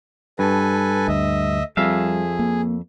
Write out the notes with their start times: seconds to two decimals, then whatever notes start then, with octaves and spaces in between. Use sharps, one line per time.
0.39 G2 A4 B4 G#5
1.08 D2 D#5 E5
1.77 F2 G3 G#4 E5 F5
2.39 A#3